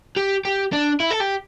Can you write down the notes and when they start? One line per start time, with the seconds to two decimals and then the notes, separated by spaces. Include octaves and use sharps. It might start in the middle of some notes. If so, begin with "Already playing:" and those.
0.17 G4
0.45 G4
0.72 D4
1.00 E4
1.11 A4
1.21 G4